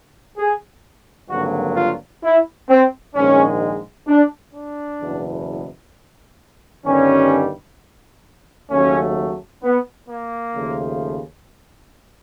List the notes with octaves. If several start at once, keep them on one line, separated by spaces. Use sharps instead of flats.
G#4
G#1 G2 D3 F#3 A#3 F#4
F4
E4
C4
A#1 G#2 D#3 G#3 C#4
D4
D4
F#1 E2 B2
G1 G2 D#3 G3 C#4
D#2 C#3 F#3 A3 C#4
B3
A#3
D#2 C#3 F3 A3